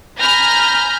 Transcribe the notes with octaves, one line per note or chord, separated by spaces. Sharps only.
G#5 A#5 B5 F6 G6 A#6